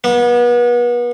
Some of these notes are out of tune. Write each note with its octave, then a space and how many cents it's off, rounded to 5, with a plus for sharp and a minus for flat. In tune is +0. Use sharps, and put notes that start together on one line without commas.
B3 -35